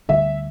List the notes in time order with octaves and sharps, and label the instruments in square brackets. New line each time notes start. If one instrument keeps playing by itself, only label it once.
[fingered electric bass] D2 D3 G3 D4 [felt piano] E5